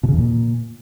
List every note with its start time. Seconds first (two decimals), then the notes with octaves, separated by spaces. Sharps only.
0.03 B2
0.08 C#3
0.13 E2
0.18 A#2